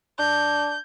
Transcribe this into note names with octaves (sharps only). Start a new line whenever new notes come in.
D4 G6